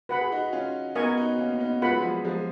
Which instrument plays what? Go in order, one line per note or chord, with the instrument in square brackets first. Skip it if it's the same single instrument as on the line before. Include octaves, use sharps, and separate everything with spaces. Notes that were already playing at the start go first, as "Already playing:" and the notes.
[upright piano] F#4 [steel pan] B4 F#5 B5
[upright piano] G#4
D#4 F#4
C#4 F4
[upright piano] B3 D#4 [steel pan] A#4 D#5 G#5 C#6
[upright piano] D#4 F#4
A#3 C#4
C#4
B3 D#4
[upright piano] G#3 [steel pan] F4 B4 F#5 B5
[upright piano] F#3
F3 G#3
F3 G#3